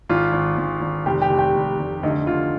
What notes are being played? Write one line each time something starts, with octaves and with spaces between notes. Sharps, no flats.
G#1 F4
G#1
G#1
G#1
F1 G4
G4
F1
G4
F1
F1
D2 D#4
D2 F4